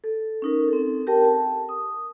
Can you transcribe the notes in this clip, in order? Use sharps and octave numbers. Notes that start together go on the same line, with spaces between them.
A4
C#4 D#4 A#4
C4 A4
G4 A#4 G5 A5
A5
D#6